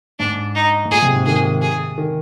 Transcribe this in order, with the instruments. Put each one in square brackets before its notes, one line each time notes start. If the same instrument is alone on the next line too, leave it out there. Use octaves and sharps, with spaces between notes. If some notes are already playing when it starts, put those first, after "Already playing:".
[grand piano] G#2 [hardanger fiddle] D4
[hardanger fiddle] D#4
[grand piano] G#2
[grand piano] A#2 [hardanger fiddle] G#4
[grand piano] C3
G#2
[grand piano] D#3 [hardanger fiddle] G#4
[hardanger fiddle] G#4
[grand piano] D#3